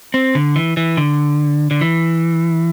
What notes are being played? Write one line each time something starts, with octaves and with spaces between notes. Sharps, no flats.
C4
D3
E3
E3
D3
D3
E3